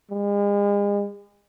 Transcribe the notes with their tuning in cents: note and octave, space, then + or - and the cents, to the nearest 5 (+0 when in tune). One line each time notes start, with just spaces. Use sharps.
G#3 -40